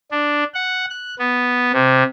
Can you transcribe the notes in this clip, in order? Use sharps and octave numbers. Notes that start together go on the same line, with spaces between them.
D4
F#5
F#6
B3
C3